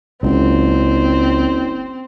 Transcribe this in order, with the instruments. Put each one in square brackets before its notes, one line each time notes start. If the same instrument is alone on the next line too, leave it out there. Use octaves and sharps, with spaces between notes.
[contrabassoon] F#1 [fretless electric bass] C#2 [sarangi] C4